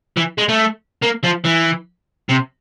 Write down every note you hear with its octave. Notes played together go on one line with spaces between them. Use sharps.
E3
G#3
A3
A#3
F3
E3
C3